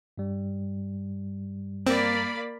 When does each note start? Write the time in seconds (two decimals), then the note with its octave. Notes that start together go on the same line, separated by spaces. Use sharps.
0.18 G2 G3
1.87 A#3 C4 D5 B5